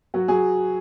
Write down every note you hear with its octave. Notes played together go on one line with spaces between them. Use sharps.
F#3 F#4
F#3 G#4